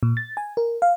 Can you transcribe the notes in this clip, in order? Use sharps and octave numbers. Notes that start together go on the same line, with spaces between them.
A#2
A6
G#5
A#4
F5